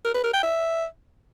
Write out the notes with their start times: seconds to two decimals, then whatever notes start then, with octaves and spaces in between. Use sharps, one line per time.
0.04 A#4
0.14 B4
0.24 A#4
0.33 G5
0.43 E5